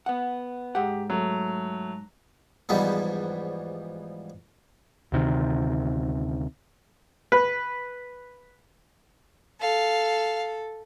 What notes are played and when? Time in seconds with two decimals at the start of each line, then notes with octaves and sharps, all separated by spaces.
0.06 B3 F#5
0.75 G#2 G4 F#5
1.10 F#3 A3
2.69 E2 G#2 E3 F3 G3 B3
5.12 D2 C3 D#3
7.32 B4
9.61 A4 F5